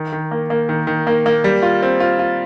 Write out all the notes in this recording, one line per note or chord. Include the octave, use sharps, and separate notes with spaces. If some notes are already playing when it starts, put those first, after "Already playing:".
Already playing: D#3
D#3
A#3
A#3
D#3
D#3
A#3
A#3
G3
F4
C4
F4
F4